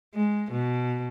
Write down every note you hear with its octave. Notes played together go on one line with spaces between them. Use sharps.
G#3
B2